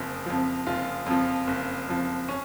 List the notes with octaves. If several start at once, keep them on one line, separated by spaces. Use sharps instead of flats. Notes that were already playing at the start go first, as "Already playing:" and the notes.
Already playing: F#1 F2 F3
F2 F3
F#1 F4
F2 F3
F#1
F2 F3
C#4